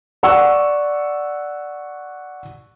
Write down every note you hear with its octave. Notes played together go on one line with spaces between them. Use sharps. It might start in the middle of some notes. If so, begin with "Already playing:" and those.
D5 F#5 C#6 E6